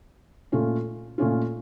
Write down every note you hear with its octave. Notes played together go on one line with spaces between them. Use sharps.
A#2 A3 C#4 F4
A#2 A3 C#4 F4